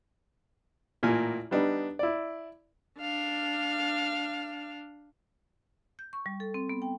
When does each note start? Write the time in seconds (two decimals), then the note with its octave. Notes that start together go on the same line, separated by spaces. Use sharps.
1.03 A1 A#2 A#3 A#4 G#5
1.51 G3 B3 D4 D#4
1.99 E4 D5
3.00 D4 F5
5.99 G6
6.13 C#6
6.26 G3
6.40 A4
6.54 C4
6.69 B3
6.82 G5